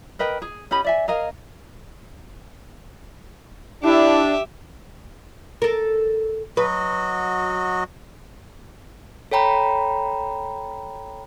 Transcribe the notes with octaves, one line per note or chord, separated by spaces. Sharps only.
A#4 B4 D#5 G5
G#4
C#4 G4 D#5 B5
D5 E5 G#5
G#4 A#4 D#5 F5
D4 E4 G4 E5
A4 A#4
F#3 F#4 B4 D#5
A4 C#5 G5 A#5 B5